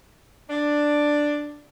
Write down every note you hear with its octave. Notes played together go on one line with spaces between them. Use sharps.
D4